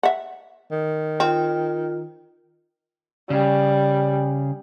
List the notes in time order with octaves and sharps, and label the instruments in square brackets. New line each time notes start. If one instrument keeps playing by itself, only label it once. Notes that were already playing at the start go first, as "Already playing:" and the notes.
[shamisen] E5 F#5
[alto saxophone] D#3
[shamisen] C4 [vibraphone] F4
[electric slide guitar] C#3 [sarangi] G3